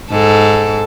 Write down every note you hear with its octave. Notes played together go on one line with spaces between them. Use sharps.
G#2 A4